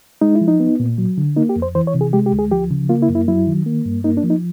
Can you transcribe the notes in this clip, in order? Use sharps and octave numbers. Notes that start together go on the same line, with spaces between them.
G#3 D#4
E4
F3
D#4
B3
A#2
F#3
D3
A#3 D#4
G4
F2
C5
E3 C5
C#5
C3
G#4
G#3 G4
G4
D2
G#4
F3 G4
C#3
A#3 F4
E4
F#2
E4
F#3 E4
D#3
A#3
G2
A#3 D#4
D4
F3
D#4